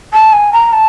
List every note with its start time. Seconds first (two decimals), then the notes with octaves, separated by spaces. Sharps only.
0.13 A5
0.33 G#5
0.53 A#5
0.73 A5